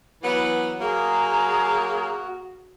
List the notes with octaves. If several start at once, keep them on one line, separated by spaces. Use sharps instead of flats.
E3 F#3 B3
F#3 A#3 F#4 G#4 A#5